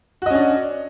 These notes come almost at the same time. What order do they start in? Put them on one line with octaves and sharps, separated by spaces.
F#4 D#5 C#4 D4